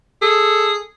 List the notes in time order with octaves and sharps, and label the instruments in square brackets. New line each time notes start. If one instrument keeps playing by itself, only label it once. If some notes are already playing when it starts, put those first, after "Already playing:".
[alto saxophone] G#4 [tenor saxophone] A4